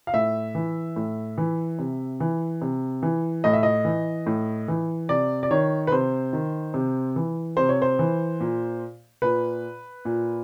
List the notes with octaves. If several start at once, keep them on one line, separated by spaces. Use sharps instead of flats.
F5
A2 E5
E3
A2
E3
C3
E3
C3
E3
A2 D#5
E5
D#5
E3
A2
E3
C3 D5
D5
D#3 C#5
B4
C3 C5
D#3
C3
E3
C3 C5
C#5
C5
E3
A#2
A#2 B4
A#2